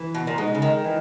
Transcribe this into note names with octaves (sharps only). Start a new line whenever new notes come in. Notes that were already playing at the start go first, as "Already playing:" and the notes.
Already playing: E3
B2
A#2
B2 G#3 D#4
C#3
D#3
E3